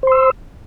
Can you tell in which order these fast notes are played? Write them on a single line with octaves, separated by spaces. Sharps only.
C5 C6 E6